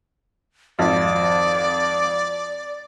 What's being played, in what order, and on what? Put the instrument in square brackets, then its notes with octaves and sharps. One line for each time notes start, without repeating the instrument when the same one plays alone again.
[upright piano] G#1 F2 [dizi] D5